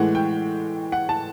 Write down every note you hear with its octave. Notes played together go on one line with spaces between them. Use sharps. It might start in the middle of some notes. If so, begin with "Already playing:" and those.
Already playing: A2 E3 G#3 F#5
G5
F#5
A5